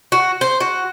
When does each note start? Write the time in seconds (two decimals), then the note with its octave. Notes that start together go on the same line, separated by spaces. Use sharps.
0.12 F#4
0.41 C5
0.60 F#4